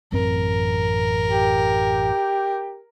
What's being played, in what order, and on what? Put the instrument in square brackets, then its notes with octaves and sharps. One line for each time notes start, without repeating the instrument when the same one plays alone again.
[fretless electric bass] A1 F#2 C4 [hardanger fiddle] A#4
[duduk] G4